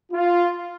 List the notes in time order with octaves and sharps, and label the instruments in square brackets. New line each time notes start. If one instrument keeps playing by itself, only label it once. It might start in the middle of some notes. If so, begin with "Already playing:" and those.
[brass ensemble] F4